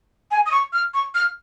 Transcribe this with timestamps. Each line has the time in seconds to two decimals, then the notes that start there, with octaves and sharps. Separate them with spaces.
0.31 G#5
0.46 D#6
0.51 C#6
0.73 F6
0.94 C#6
1.15 F6